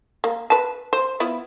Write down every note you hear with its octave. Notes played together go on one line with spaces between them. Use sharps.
A#3
B4 A5
C5
B3 E4 F4